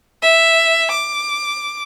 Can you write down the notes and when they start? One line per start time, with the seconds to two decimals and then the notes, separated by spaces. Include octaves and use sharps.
0.22 E5
0.91 D6